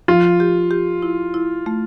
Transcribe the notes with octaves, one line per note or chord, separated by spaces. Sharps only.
F3 F4
G4
G4
E4
E4
A3